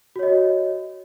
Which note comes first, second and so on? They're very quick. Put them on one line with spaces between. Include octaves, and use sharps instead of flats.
F#4 C#5 D#5